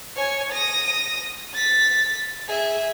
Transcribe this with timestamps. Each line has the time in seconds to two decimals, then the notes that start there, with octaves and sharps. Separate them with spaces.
0.16 C#5 G#5
0.52 D#6 A#6
1.54 A6 B6
2.49 G#4 E5